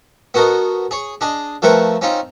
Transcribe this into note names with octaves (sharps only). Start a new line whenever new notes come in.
B3 F#4 A4 A#4 D#5
G#4 C#5
D4 G#4 D#5
F3 A3 C4 A#4 B4 C#6
C4 C#4 D#4 F4